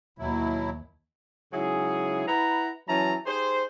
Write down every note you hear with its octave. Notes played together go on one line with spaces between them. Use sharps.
D#2 B2 F#3 E4
G#2 C#3 F#3 E4 G#4
E4 B4 F#5 A#5
E3 F#3 C#4 E4 A5 A#5
D#4 G4 G#4 C5